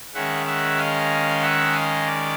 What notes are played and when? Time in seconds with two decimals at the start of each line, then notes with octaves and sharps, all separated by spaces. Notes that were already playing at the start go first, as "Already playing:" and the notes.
0.14 D#3 G#3 C#4 E5 F#5
0.46 E5 F#5
0.78 D#5 F5
1.42 E5 F#5
1.74 D#5 F5
2.06 D5